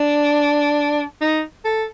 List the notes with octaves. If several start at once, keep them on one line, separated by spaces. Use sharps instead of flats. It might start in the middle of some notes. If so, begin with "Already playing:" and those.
Already playing: D4
D#4
A4